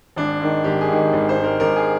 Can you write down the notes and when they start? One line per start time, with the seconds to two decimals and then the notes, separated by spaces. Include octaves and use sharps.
0.16 G#1 D4
0.41 G#2 D#3
0.64 G#1 G4
0.81 G#4
0.88 G#2 D#3
1.13 G#1
1.29 C5
1.37 G#2 D#3
1.44 A#4
1.60 G#1 A#4
1.76 G#4